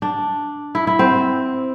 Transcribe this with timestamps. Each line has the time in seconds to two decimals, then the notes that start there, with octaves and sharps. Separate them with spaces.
0.02 D4
0.75 E4
0.87 E4
0.99 C4